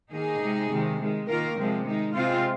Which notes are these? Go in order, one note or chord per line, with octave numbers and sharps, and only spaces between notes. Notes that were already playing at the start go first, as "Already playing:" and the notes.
D#3 A#3 D#4 G#4
C3 G#3
C3 D#3 G#3
D#3 G#3
D#3 A#3 F4 A#4
C3 F3 G#3 C4
D#3 G#3 D#4
C3 G#3 C4 F4